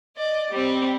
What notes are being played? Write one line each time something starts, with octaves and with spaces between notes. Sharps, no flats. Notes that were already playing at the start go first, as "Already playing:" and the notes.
D5 D#5
G3 C4